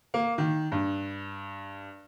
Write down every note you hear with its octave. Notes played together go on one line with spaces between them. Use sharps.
A#3
D#3
G2